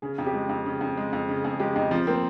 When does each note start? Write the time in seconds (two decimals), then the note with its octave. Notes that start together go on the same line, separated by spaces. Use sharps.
0.02 C#3 G#4
0.18 F2
0.26 G4
0.34 G#3
0.49 F2
0.66 C#3
0.81 F2
0.97 G#3
1.13 F2
1.29 C#3
1.44 F2 G#4
1.59 G#3 G4
1.75 F2 D#4
1.91 F3 C4
2.07 A#3 C4